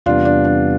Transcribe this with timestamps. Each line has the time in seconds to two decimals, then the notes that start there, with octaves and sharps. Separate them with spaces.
0.06 E2 C3 G3 B3 D4 F4
0.25 D4
0.45 D4